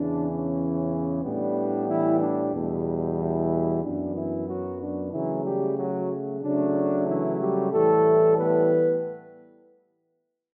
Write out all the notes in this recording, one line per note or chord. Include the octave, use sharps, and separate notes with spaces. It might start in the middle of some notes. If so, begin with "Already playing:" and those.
Already playing: E2 C#3 E3 D4
C#4
A2 G3 B3 D4
E3 E4
D4
E2 B2 G3
E3 E4
F#2 E3 B3 D4
E3 E4
F#3 F#4
D4
C#3 E3 F#3 A3 E4
G3 G4
F#3 F#4
C#3 F#3 A3 D4
E3 E4
G3 G4
A2 E3 G3 A3 A4
B3 B4